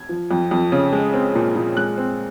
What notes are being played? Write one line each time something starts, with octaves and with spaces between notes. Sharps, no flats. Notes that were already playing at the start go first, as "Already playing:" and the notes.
Already playing: G#6
F3
F2
F2
C#3
G#3
C4
A#2
A#2
G#3 F#6
C4